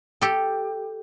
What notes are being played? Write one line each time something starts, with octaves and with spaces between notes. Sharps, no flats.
G4 A4